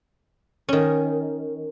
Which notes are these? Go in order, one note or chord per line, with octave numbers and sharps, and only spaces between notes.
D#3 C#4